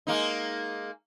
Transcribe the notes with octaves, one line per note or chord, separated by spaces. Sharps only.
G#3 A#3 D#4